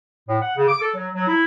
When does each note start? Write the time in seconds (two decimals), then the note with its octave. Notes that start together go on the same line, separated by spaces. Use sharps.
0.28 A2
0.41 F#5
0.55 C#3
0.68 D6
0.80 A4
0.94 F#3
1.15 F#3
1.28 E4